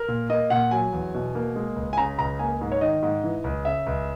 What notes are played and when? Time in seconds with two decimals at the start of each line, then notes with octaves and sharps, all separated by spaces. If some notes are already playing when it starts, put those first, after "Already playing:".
Already playing: A#4
0.08 A#2
0.30 A#3 D#5
0.50 A#2 F#5
0.71 F#3 G#5
0.93 E2
1.14 B2
1.35 A#3
1.56 G#3
1.76 C#2
1.93 G#5
1.98 C#3 A#5
2.19 C#2 A#5
2.39 A#3 G#5
2.61 G#2
2.72 C#5
2.81 D#3 D#5
3.02 G#2
3.24 E3
3.44 C#2
3.65 C#3 E5
3.87 C#2